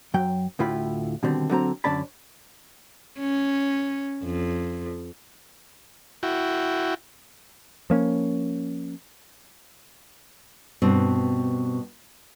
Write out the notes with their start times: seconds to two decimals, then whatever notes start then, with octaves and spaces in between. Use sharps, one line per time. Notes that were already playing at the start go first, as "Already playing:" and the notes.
0.14 F#2 F#3 G5
0.59 D2 A2 E4 F4 G5 B5
1.23 B2 D3 D#3 G3 C4
1.50 D3 F#3 C4 A#5
1.84 F#2 D3 C#4 D5 A5 B5
3.19 C#4
4.24 F2
6.23 E4 F#4 G5
7.90 F3 A#3 C#4
10.82 G2 B2 C4